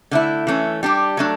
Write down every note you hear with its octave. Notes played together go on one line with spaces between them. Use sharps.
D3 A3 E4
E3 A3 C#4
G3 D4 G4
F#3 A3 D4